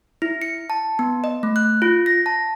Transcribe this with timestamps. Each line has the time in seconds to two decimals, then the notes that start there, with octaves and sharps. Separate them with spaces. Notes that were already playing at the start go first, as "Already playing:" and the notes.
0.22 E4
0.42 C#7
0.70 A5
0.99 B3
1.24 D#5
1.43 A3
1.56 F#6
1.82 F4
2.06 A#6
2.26 A5